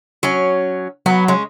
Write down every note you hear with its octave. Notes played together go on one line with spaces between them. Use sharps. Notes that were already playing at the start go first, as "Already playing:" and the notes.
F#3 C#4
F#3 B3
G#3 C#4